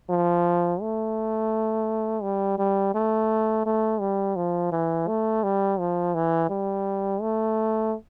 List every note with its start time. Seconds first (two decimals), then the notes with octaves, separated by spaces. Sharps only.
0.10 F3
0.82 A3
2.23 G3
2.59 G3
2.94 A3
3.66 A3
4.01 G3
4.36 F3
4.72 E3
5.08 A3
5.43 G3
5.80 F3
6.15 E3
6.50 G3
7.22 A3